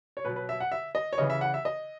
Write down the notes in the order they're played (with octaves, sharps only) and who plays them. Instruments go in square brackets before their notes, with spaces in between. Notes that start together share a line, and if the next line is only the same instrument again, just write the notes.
[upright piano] C#5
B2 F#3 B4
B4
E5
F#5
E5
D#5
C#5
C#3 E3 D#5
E5
F#5
E5
D#5